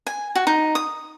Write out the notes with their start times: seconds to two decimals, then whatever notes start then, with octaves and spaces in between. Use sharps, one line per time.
0.07 G#5
0.35 F#4
0.47 D#4
0.75 D#6